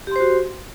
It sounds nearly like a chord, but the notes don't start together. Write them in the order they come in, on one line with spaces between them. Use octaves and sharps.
G4 C6 C5 F#4